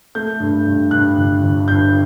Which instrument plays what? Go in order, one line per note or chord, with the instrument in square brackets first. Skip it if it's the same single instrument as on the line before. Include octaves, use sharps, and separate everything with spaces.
[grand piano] A3 G6
G2
G2
G2 F#6
G1
G1
G2 G6